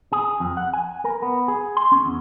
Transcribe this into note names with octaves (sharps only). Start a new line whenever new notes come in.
G#4
F2
F#5
G#5
A#4
B3
G#4
C6
C#4
E2